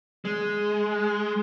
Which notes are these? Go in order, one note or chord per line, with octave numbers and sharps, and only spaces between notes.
G#3